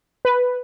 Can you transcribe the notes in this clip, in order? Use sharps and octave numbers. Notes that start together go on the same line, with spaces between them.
B4